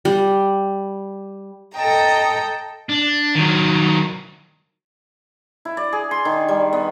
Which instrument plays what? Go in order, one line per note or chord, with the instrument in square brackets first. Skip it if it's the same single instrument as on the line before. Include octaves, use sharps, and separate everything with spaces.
[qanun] G3
[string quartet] A4 D#5 G5 A#5
[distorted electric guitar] D4
D#3 F#3
[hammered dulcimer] E4
D5
G#4
C6
D#3
G3
B3